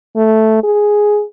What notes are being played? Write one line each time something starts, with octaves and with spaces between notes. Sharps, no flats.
A3
G#4